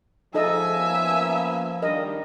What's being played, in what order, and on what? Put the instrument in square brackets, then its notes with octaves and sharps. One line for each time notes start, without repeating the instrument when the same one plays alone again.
[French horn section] G#2 [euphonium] F3 [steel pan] D#4 A4 D#5 [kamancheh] E5 G#5
[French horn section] A#3 B3 C#4
[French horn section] D#3 G3 D4 [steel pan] A#4 D#5